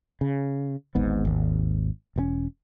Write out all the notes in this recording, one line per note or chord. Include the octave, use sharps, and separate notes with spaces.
C#3
D1 G#1 G#2 B3
G#1 D#2
E1 A#2 C#4